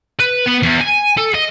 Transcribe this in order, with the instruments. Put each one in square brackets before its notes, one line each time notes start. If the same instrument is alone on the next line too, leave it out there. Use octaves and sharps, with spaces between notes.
[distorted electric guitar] B4
B3
E2
G#5
A4
D#5